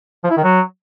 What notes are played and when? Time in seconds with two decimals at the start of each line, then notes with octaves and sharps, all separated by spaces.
0.24 F3
0.31 E4
0.37 D#3
0.44 F#3